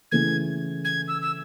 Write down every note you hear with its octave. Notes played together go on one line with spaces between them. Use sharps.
C#3 E3 A3 G#6
G#6
E6
E6